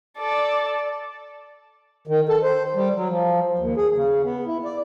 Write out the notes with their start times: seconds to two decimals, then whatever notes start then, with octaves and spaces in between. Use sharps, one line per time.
0.18 A4 D5
2.07 D#3
2.29 A4
2.42 C5
2.75 G3
2.95 F#3
3.09 F3
3.59 D#2
3.77 G#4
3.94 C#3
4.24 B3
4.46 E4
4.64 D5